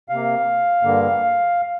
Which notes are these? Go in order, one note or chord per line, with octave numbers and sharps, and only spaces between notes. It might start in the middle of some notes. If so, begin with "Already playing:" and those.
C3 A#3 F5
G2 D3 A#3